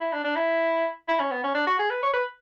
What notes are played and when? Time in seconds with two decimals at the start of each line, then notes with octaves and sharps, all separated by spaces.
0.01 E4
0.13 D4
0.24 D4
0.36 E4
1.08 E4
1.20 C#4
1.31 B3
1.44 C#4
1.54 D4
1.67 F#4
1.79 G#4
1.90 B4
2.03 C#5
2.14 B4